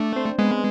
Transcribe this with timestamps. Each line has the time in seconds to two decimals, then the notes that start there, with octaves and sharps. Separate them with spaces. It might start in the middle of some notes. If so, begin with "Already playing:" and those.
Already playing: A3 D4 D5
0.16 C4 C5
0.38 G#3 B3 B4